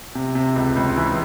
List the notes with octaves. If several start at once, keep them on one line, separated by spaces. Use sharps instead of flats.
C3
C3
C#2
C#2
E3